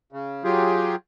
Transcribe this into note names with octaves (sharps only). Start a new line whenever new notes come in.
C#3
F#3 F4 G4 G#4